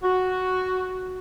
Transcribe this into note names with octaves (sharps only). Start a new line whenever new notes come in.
F#4